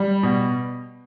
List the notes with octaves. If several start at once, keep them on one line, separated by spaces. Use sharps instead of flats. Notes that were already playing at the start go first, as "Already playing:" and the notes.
Already playing: G3
B2